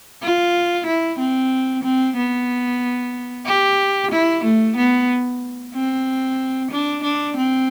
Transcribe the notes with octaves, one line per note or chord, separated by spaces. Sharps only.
F4
E4
C4
C4
B3
G4
E4
A3
B3
C4
D4
D4
C4